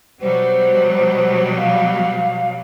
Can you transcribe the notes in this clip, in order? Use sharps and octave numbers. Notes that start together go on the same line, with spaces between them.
B2 F#3 G3 C5
F5